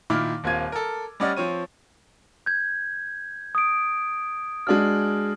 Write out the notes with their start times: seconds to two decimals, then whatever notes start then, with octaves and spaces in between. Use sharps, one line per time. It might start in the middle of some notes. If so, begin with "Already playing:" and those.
0.10 A#2 D#3 E4 D6 F6
0.44 D#1 A#3 C4 F4 G#6 D#7
0.72 A4 A#4
1.20 G3 C#4 D5 D#5 F#5 F6
1.37 F3 C4 C#5 D#7
2.46 G6 G#6
3.55 D#6 D7
4.67 G#3 D4 F#4 F6